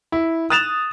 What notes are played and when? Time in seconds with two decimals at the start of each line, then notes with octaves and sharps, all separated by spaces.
0.12 E4
0.50 D#6 F#6 A6 E7 F7